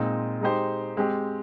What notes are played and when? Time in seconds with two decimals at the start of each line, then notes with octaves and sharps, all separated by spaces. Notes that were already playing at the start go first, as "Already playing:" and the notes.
Already playing: A#2 G#3 C4 D#4
0.41 G#3 D#4 G4 C5
0.97 G#3 C4 G4